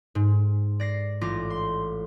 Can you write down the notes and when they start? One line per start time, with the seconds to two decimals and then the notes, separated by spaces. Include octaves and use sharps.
0.15 G#2
0.80 D5 A#6 C7
1.21 A1 F4 D6 A#6
1.50 C6